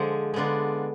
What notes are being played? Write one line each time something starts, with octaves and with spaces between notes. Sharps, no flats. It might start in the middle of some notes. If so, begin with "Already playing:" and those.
Already playing: D3 F3 G#3
D3 G#3 B3 D4 F4